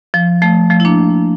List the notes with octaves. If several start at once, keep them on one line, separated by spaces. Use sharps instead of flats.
F3
F3 A3
F3 A3
E4
A#3 D4